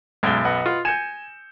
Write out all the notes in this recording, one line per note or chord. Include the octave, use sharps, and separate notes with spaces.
B1 F#2 G#3 G7
B4 D#5 F#5
F4
G#5 G6 C#7 E7